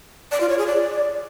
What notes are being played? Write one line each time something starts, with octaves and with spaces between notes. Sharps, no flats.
D5
F4
C#5
G#4
D5